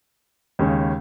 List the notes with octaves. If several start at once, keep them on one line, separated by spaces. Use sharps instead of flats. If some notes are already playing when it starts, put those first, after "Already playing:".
D#2 C#3 G#3 C#4